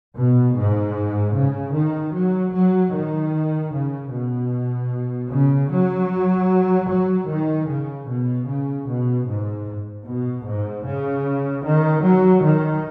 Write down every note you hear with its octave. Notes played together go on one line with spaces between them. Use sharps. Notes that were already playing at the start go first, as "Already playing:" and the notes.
B2
G#2
C#3
D#3
F#3
F#3
D#3
C#3
B2
C#3
F#3
F#3
D#3
C#3
B2
C#3
B2
G#2
B2
G#2
C#3
D#3
F#3
D#3